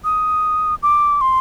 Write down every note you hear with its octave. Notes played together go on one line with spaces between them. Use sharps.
D#6
D6
C6